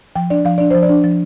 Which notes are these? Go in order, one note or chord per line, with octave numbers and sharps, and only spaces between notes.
F3 G5
D4 D5
F3 F5
D4 D5
F3 C5
D5
D4
F3